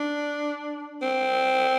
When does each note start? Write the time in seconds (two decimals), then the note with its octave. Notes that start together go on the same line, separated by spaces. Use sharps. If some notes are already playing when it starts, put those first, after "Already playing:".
Already playing: D4
1.02 C4